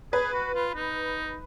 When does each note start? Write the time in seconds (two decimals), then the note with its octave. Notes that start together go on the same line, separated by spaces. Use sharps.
0.12 G#4 B4
0.33 F#4
0.54 F4
0.75 D#4